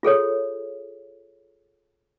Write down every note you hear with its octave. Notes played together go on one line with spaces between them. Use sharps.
F4 G#4 A4 C#5